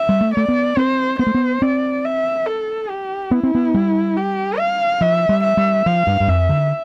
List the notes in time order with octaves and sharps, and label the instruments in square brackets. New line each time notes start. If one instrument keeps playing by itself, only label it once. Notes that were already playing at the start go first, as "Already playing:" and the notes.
Already playing: [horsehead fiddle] E5
[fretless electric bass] G3
A3
[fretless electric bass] A3 [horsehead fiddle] D5
[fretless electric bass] B3
[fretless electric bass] C4 [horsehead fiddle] C5
[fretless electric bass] B3 [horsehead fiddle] C5
[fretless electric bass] A3
B3
[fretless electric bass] C4 [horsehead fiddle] D5
[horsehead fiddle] E5
A4
G4
[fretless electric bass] B3 [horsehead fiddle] E4
[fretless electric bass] C4
B3
G3
[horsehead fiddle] G4
F5
[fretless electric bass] F3 [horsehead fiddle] E5
[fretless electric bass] G3
[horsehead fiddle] E5
[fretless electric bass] G3
[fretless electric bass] F3 [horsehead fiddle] F5
[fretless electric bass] G2
G2
[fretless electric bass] F2 [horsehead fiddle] E5
[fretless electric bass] D3